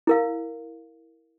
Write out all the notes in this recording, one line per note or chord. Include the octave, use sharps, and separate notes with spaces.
E4 A#4 F5